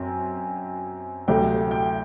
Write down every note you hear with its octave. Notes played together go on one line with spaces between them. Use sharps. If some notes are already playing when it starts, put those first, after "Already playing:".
Already playing: F#2 C4
D2 C3 F#3 A3 G5
G5